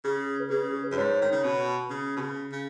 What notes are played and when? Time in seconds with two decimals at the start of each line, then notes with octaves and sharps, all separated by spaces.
0.04 C#3 G#4
0.40 B4
0.50 C#3 G#4
0.70 G#4
0.84 B4
0.91 F#2
0.97 G#2 C#5
1.21 D#3
1.32 C#3
1.44 B2
1.90 C#3
2.16 B2
2.21 C#3
2.52 C#3